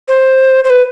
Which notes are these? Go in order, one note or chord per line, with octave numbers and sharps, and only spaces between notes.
C5
C5
B4